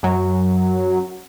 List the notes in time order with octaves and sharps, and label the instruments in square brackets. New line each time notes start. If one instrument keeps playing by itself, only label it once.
[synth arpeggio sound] F#2 F#3